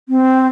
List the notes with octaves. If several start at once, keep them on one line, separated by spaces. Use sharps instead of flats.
C4